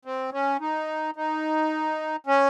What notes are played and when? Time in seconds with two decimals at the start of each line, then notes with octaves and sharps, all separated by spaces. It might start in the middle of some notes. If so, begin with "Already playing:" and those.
0.05 C4
0.32 C#4
0.61 D#4
1.16 D#4
2.27 C#4